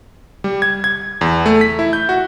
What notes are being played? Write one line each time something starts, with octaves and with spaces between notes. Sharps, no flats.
G3
G#6
G#6
E2
A3
B6
E4
G6
F#4